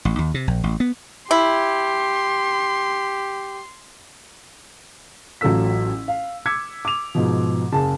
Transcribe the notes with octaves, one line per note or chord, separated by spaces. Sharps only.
A1
D#2
C3
A#1
A1
B3
E4 G4 C6
A1 F#3 F4 A4 E6 B6
F5
D6 E6 G#6 B6 C#7
D6 F7
G#2 B2 F3
F#1 G#4 A5